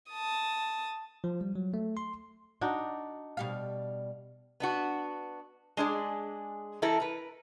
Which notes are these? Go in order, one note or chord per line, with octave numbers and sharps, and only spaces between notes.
A5 D#6
F3
G3
F#3
A3
C6
D4 D#4 F#4
B2 G3 F5
B3 D4 F#4
G#3 D4 G#4 D5
E3 E4 A4 A#4
A#4 B4